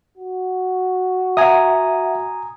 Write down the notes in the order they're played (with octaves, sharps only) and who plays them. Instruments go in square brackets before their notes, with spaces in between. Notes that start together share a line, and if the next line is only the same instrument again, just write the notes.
[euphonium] F#4
[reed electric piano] E5 F#5 [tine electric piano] G#5 A#5 D#6